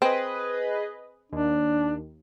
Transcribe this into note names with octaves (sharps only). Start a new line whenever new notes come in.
C4 G#4 B4 D#5
D#2 D4